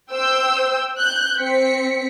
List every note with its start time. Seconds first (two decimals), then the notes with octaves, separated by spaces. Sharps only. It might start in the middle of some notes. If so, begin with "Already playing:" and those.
0.11 C5 G5 E6 G6
0.98 F#6 G6
1.39 C4 B6 C#7